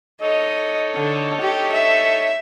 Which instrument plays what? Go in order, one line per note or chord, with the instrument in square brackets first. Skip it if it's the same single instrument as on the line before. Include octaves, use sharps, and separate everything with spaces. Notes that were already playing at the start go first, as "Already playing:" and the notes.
[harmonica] D#4 A4 C#5 [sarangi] D#5
[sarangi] D3
G4
E5